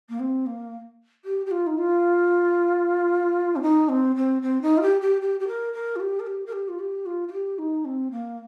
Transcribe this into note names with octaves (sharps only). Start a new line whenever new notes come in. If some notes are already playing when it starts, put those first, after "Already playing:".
A#3
C4
A#3
G4
G4
F4
D#4
F4
C4
D#4
C4
C4
C4
D#4
F4
G4
G4
G4
G4
A#4
A#4
F4
G4
A#4
G4
A#4
G4
F4
G4
F4
F4
G4
D#4
C4
A#3